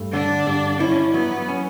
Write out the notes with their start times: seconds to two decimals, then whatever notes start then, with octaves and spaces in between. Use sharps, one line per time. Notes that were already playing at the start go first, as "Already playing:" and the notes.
Already playing: G2 A3
0.13 D3 D4
0.46 G2
0.80 C#4 E4
1.14 F#3 B3
1.48 C#4